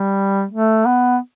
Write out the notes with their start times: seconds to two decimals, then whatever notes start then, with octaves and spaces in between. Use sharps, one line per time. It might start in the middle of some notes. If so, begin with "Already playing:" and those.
Already playing: G3
0.51 A3
0.85 B3